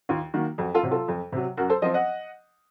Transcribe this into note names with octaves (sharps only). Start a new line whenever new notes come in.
D#2 F4
D#3 A#3 F#4
F2 F#4
F4 A4
C3 F#3
F4 A4
F2
C3 F#3
F#2 F#4 A#4
A4 C5
F3 C4 C5 D#5
D#5 F#5